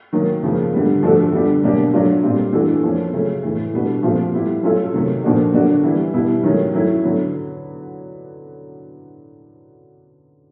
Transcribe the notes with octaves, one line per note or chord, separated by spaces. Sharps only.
D#3 F#3 A#3
C#3 F3 A#3
D3 G3 B3
F3 A3 D4 F#4 A4
D3 G3 B3 D4 G4
B2 F#3 A#3 D4 G4
F#3 A3 D4 F4
A#2 G3 C4 F4
E3 A3 D4 F#4 A4
F3 A#3 C#4
C#3 F#3 A3 C#4
A2 E3 A3
B2 G3 B3 D4 F#4
A#2 F3 A3 C4 F4
G3 B3 E4 G4
F#3 A3 C#4 F4 A4
C3 D#3 F#3 A3
A#2 F3 A#3 D4 F#4
D3 F#3 A#3 D4 F#4
E3 G3 B3 E4
B2 G3 B3 E4
D#3 F#3 A3 C#4
F#3 A3 C#4 E4
D3 F#3 B3